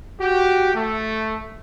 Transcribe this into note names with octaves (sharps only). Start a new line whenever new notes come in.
F#4 G4
A3